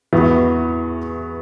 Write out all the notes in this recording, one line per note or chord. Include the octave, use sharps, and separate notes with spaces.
E2 E3 B3 F#4